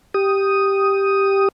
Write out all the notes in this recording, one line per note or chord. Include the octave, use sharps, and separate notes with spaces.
G4 D#6